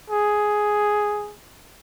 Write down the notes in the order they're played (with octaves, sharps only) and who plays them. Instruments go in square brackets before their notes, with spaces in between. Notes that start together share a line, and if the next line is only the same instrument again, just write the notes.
[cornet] G#4